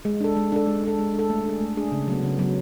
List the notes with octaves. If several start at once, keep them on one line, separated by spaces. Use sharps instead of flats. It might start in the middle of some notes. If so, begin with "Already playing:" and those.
G#3
D4 A4
G#3
D4 A4
G#3
D4 A4
G#3
D4 A4
A3
D4 G#4
A3
D4 G#4
C#3
F#3 B3
C#3
F#3 B3